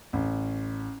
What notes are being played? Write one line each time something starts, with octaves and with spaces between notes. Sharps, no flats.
A1